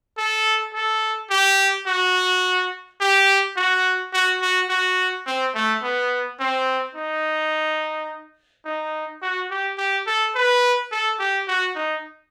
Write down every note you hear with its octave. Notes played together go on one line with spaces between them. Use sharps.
A4
A4
G4
F#4
G4
F#4
F#4
F#4
F#4
C4
A3
B3
C4
D#4
D#4
F#4
G4
G4
A4
B4
A4
G4
F#4
D#4